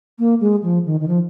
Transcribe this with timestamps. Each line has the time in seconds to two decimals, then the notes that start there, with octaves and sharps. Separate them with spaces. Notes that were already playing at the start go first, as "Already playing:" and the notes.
0.19 A#3
0.41 G#3
0.63 F3
0.86 D#3
1.00 D#3
1.08 F3